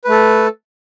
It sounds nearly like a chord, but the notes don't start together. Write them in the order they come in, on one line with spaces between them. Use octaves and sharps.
B4 A3 A4